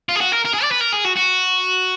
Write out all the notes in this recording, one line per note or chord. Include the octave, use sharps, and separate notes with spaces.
F4
G#4
F#4
A#4
A#4
G#4
D5
B4
A#4
G#4
F#4
F#4